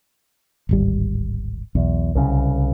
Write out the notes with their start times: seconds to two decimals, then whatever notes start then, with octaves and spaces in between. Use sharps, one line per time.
0.69 D1 G#1 G3
1.75 B1 E2
2.15 C2 C#3